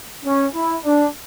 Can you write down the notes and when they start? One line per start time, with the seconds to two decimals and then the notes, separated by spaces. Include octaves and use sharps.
0.25 C#4
0.54 E4
0.85 D4